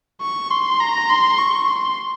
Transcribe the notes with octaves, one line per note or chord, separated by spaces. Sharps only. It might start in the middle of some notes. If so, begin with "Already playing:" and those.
C#6
C6
A#5
C6
C#6
C6